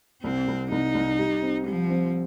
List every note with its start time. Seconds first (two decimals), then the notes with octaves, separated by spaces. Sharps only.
0.23 C2 C4
0.48 C2
0.71 C2 D#4
0.95 C2
1.19 G3
1.42 C4
1.66 F3 G3
1.90 C4